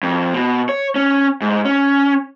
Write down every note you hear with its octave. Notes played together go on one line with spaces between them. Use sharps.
F2
B2
C#5
C#4
G#2
C#4